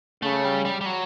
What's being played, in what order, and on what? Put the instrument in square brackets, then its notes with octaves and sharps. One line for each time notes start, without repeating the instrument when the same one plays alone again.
[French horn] C#3 [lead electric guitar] A3
[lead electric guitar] G3
G3
G3
F#3